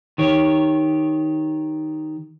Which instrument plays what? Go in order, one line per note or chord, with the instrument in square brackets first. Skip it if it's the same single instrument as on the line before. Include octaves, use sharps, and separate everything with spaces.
[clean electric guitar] D#3 G4 C#5